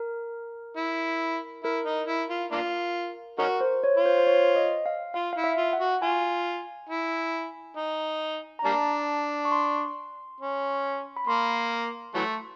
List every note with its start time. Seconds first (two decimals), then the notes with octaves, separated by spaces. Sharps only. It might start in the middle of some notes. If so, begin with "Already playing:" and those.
Already playing: A#4
0.77 E4
1.64 E4 A#4
1.86 D#4
2.08 E4
2.30 F4
2.52 A#3 D4 F4
3.39 C#4 D#4 F#4 A#4
3.61 C5
3.84 C#5
3.97 F4
4.06 C5
4.17 C5
4.27 C#5
4.56 D#5
4.86 F5
5.14 F4 F5
5.33 E4 F5
5.44 E5
5.58 F4
5.73 F#5
5.80 F#4
6.02 F4 G#5
6.89 E4
7.77 D#4
8.59 A#5
8.65 G3 A#3 D4 A5
9.45 C#6
9.52 C6
10.41 C#4
11.17 B5
11.27 A#3 C6
12.15 E3 F#3 A3